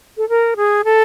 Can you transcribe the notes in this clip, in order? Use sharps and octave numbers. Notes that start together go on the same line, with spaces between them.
A4
A#4
G#4
A4